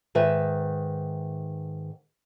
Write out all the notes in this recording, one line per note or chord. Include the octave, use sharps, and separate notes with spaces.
G#2 D#3 B4 E5